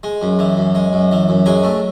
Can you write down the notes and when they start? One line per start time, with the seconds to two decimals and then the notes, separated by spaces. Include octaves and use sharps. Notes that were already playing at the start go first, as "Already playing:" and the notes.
0.03 G#3
0.22 F#2
0.39 E3
0.57 F#2
0.75 G#3
0.93 F#2
1.11 E3
1.29 F#2
1.46 F#3 G#3 G#4
1.64 A3